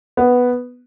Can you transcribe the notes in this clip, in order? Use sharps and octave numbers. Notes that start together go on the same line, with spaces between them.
B3